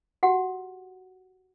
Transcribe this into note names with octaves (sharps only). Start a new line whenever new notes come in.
F#4 G4 F#5